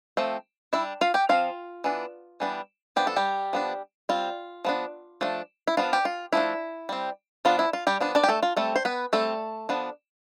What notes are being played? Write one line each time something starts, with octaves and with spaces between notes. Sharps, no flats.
F3 A3 C4
G3 D4 E4 E5
F4 F5
G4 G5
F3 C4 F4 F5
E3 B3 D4
E3 G3 B3 D4
F3 B3 D4 G4
A4
G3 G4
F3 B3 D4
G3 C4 F4
F3 B3 D4
F3 A3 D4
E4
F3 B3 D4 F4
G4
F4
F3 A3 D4 E4
G3 C4
F3 B3 D4 F4
E4
F4
G3 G4
F3 B3 D4
D4 D5
G4
A3 A4
F4
G3 A3 C4 A4
C5
B3 B4
G3 A3 C4 A4
F3 B3 D4